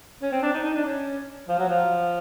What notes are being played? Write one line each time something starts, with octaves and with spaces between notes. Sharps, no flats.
C#4
C4
D4
D#4
D#4
D4
C#4
F3
F#3
F3